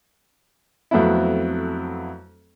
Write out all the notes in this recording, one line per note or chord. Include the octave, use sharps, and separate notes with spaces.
F2 F#3 A3 B3 C4 E4